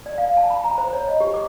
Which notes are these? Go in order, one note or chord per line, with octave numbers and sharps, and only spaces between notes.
D5
F5
A5
B5
A#5
C5
C#5
D#5
G4
D6